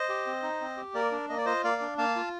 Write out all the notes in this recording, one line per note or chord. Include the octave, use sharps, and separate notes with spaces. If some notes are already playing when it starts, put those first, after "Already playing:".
Already playing: C5 D#5
G4
C4
D#4
C4
G4
A#3 A#4 D5
D4
A#3 D#5
D5
F4 C5 D#5
A#3 D5 F5
D4
A#3 F5 A5
F4